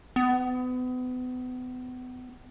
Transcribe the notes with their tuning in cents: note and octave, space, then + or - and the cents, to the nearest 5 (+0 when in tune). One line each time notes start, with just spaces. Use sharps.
B3 +35